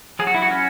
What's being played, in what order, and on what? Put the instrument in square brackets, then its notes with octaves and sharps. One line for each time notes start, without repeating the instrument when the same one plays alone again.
[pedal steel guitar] F#3 G#4
F#4
E4
F#4
C#4